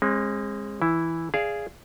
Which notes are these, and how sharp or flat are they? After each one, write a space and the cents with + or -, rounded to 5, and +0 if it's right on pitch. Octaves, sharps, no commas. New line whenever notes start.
G#3 -15 C4 +40
E3 +0 E4 +0
G#4 +0 D5 +0 F5 -25